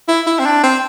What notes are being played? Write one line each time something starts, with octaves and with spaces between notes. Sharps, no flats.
E4
E4
C4
D4
C4